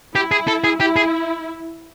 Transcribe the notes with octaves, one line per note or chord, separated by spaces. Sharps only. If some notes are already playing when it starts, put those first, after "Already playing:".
E4 G4
G#4
A4
G#4
E4 G4
G#4